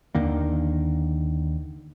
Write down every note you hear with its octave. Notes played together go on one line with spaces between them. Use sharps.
D#2 D3 D#3 A#3